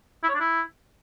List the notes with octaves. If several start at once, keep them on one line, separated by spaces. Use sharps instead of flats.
E4
C#5
D4
E4